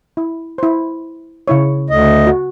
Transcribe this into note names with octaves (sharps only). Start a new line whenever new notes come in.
E4
E4 C5
C#3 E4 C#5
D2 D#5
F#4